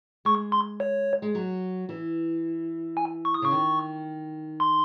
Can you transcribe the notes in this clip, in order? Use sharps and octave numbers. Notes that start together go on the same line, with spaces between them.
G#3 C#6
C6
C#5
G#3
F#3
E3
G#5
C#6
D#6
C#3 C#6
D#3
C6